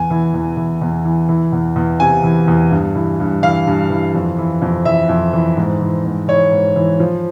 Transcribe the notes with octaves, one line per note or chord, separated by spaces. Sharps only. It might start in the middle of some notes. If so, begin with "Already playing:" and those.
Already playing: E2 G#5
E3
E2
E3
E2
E3
E3
E2
E2
C3 G#5
E3
E2
G2
E3
G2
E3 F5
G2
E3
F2
E3
F2
E3 E5
F2
E3
G#2
E3
G#2
E3 C#5
G#2
E3
F3